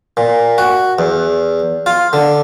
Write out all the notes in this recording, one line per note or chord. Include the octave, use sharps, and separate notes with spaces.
A#2
F#4
E2
F4
D3